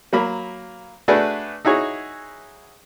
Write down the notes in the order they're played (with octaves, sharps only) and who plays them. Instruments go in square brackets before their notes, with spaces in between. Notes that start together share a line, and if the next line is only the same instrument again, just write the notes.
[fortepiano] F#3 A#3 B5
A3 D4 F#4 G#4 B4 D5
D#4 E4 F#4 G#4 C#5